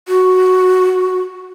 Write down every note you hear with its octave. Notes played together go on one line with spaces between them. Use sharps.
F#4